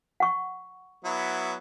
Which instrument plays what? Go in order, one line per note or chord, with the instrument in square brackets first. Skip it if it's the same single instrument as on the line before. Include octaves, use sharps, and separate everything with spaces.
[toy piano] F#5 C#6
[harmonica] F#3 B3 E4